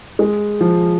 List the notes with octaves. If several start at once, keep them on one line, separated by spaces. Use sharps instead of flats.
G#3
F3